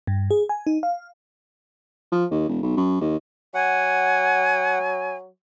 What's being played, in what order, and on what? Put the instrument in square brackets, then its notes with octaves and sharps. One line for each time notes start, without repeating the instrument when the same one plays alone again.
[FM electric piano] G2
G#4
G#5
D#4
F5
[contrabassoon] F3
D#2
E1
B1
F#2
D#2
[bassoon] F#3 [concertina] F#5 [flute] G#5